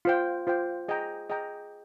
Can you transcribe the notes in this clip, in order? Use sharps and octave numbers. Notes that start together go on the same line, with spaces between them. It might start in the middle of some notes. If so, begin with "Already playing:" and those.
F4 C5 G5
F4 C5 G5
G#4 D#5 G5 A#5
G#4 D#5 G5 A#5